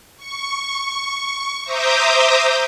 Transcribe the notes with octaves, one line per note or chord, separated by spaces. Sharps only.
C#6
C5 E5 A#5 D6 D#6 G6